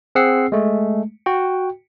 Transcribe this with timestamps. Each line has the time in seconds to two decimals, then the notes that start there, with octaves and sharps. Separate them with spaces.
0.15 C4 G#4 F#5 E6 C7
0.52 G#3 A3
1.26 F#4 G5